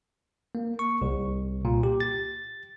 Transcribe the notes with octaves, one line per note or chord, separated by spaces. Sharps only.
A#3
C#6
C2
A#2
G4
A6